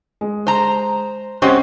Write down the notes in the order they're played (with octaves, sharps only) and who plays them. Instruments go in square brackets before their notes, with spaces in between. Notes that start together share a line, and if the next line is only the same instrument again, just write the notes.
[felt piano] G#3
[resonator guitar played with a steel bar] C5 A#5
[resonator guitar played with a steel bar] G#3 C4 C#4 [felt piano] G4 C5 F#5